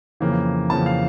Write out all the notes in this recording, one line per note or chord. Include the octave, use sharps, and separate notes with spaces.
F2 C#3 E3 A#3
F2 C#3 E3 A#3 A5
F5